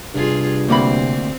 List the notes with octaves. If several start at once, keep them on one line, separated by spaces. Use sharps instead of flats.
G2 C3 F4 G#4
D2 A#3 C4 B5